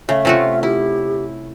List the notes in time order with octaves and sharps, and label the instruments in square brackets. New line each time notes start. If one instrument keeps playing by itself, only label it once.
[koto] C#3 [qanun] A3 [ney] E5
[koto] C3 A3 F#4 [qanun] C#4 F4
[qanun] E4 [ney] G4